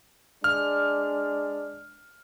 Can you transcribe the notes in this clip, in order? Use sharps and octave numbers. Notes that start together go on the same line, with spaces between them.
G#3 D4 F6